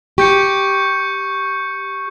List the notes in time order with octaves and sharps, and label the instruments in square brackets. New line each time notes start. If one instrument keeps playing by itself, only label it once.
[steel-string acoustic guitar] G4 [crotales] C#6 G6 C#7